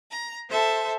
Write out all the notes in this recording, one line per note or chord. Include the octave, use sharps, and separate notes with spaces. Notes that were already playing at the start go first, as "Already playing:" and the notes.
A#5
A4 C5 E5 A5